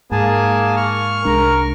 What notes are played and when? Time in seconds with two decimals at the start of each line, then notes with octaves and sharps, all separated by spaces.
0.12 G#2 A#3 G#4 G#5 A5
0.76 C#6 F6
1.25 C2 G#3 D4 A#4